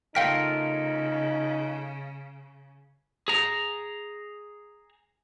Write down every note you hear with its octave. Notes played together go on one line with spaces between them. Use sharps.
C#3 A3 D#4 F4 A#4 F5 G5 B6
G#4 A#5